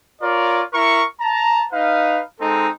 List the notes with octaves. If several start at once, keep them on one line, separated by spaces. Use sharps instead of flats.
F4 A#4 C#5 D5
E4 A#4 C#6
A5 A#5
D#4 B4 F5
G#3 C4 D#4 A4